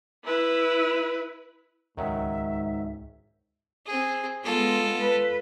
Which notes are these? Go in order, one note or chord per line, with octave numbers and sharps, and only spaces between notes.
E4 B4
C#2 G#2 D#3 F#3 C#4 E5
C4 G#4
G#3 B3 F4 A4
B4